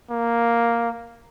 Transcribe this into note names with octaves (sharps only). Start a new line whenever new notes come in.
A#3